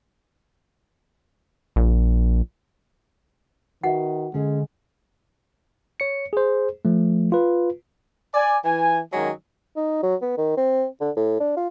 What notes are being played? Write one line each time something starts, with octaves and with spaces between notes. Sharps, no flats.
A#1
D#3 F#4 B4 E5 F#5
D3 G#3 C#4 G#4
C#5 C#7
G#4 C5
F3 A3
F4 B4
D5 G#5
E3 G#5
F#2 D#3 F#3 G#3 D#5 G#5
D#4
F#3
B3
D#3
C4
D3
A2
D4
F4